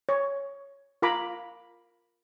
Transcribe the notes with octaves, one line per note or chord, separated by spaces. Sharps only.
C#5
F4 A#4 A#5 B5 D6